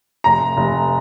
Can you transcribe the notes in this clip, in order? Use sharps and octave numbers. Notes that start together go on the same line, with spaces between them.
F1 A#5
F1